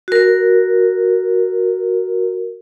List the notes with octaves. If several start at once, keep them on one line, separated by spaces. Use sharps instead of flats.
F#4 A#4